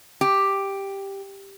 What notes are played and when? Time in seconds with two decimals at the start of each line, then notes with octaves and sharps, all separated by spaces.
0.21 G4